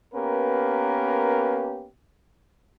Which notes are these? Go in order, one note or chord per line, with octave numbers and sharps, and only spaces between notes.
A#3 B3 C#4 G4 A#4 B4